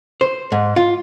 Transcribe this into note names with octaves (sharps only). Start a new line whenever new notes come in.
C5
G#2
F4